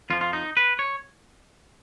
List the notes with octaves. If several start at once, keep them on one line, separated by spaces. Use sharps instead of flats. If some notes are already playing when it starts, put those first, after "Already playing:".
F2 F3 F4
F4
D#4
B4
C#5